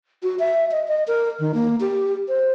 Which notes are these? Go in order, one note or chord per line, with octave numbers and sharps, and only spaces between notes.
F#4
E5
D#5
D#5
A#4
D#3
A#3
G4
C5